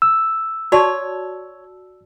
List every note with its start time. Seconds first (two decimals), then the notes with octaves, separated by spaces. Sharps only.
0.02 E6
0.72 F#4 C#5 D5 A5